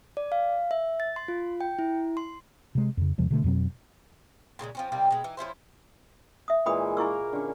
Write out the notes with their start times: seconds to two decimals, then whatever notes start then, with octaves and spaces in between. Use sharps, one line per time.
0.17 D5
0.32 F5
0.71 E5
1.00 A6
1.16 C6
1.28 F4
1.61 G5
1.79 E4
2.17 C6
2.75 C3 G#3
2.97 F2 C#3
3.18 E2 C3 F3 G#3
3.30 B2 D3 A3
3.44 F2 B2 F#3 C4
4.59 A#2 C#3 G3 G#3
4.75 F3 C4 C#4
4.92 C3 G3 A#3 D#4
5.11 B2 G#3
5.24 E3 D#4
5.37 F3 C#4 E4 C5
6.48 E5 D#6
6.66 A#2 E3 G#3 G5 B5 D#6
6.97 A#3 E4 A#4 C#6 E6
7.33 D3 C#4